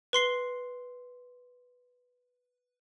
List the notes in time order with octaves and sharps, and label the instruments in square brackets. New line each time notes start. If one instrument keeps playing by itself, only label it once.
[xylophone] B4 C6 C7 G7